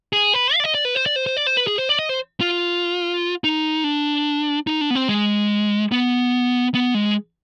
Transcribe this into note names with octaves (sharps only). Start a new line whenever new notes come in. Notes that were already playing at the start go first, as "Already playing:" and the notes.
G#4
B4
F5
D5
D#5
D5
B4
C5
D5
C5
C5
D5
C5
B4
G#4
C5
D5
D#5
C5
F4
D#4
D4
D#4
D4
B3
C4
G#3
B3
B3
G#3